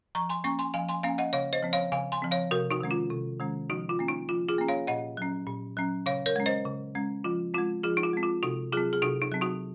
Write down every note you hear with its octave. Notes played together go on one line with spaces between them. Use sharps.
F3 A#5 C#6
G#5 C6
A#3 C#4 A#5 C#6
G#5 C6
F3 F5 G#5
G#5 C6
A#3 C#4 F5 G#5
D#5 F#5
C#3 C#5 F5
C5 D#5
F3 C4
C#5 F5
C#3 F5 G#5
G#5 C6
F3 C4
C#5 F5
C3 F#4 A#4
D#4 F#4
D#3 G#3 C#4
F4
C3
D#3 G#3 C#4
F3 D#4 F#4
F4
A#3 C#4
D#4
F3 F4
F4 G#4
A#3 C#4
C#5 F5
A#2 D#5 F#5
F#3 C#4
A#2
F#3 C#4
C#3 C#5 F5
A#4 C#5
G#3 C#4
C5 D#5
C#3
G#3 C#4
F3 F4
G#3 C4 F4
F3 F4 G#4
D#4
F4
G#3 C4
F4
C3 D#4 F#4
F#3 C4 F4 G#4
G#4
C3 D#4 F#4
D#4
F#3 C4
D#4 F#4